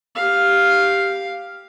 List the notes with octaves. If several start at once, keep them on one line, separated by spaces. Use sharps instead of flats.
G4 F5